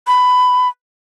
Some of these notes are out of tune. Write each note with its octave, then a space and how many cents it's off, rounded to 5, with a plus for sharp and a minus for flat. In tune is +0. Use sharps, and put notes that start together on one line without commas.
B5 +15